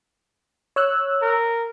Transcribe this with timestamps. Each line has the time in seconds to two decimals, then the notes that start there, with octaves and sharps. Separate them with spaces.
0.76 C#5 E6 F#6
1.22 A#4